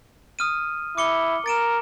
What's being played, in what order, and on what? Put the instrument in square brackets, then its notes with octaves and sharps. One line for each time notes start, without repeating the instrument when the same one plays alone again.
[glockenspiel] D#6 F6 D#7
[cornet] E4 [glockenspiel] D6 C#7 G7
[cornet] A#4 [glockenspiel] A6 D7 E7